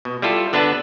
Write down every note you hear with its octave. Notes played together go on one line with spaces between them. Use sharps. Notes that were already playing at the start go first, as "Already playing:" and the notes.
B2
G3 E4 F4 A4
D3 B3 D4 B4 A5